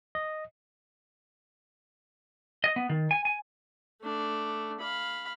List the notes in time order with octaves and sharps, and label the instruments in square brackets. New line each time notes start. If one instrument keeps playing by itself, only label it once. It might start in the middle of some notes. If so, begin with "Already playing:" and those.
[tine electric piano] D#5
[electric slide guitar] D#5
B3
D#3
G#5
G#5
[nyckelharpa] A3 D4
F5 B5